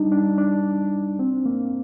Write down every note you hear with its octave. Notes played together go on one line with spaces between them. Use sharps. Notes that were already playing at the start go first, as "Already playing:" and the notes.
Already playing: G3 D4 D#4
D4
D4
C4
A#3